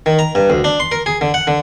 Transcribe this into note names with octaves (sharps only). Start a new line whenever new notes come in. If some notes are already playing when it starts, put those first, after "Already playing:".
D#3
A#5
G2
D2
D4
C6
A#4
G#4
D3
F#5
D3